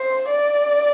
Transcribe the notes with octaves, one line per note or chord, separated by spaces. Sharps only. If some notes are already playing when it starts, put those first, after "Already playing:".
Already playing: C5
D5